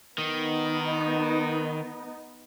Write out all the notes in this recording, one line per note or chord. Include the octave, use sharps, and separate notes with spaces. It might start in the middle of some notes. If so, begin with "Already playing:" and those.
D#3 B3 D#4